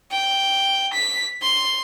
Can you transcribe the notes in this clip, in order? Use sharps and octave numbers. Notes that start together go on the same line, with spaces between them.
G5
B6
C6